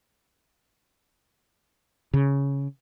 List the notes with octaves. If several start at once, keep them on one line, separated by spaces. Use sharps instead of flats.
C#3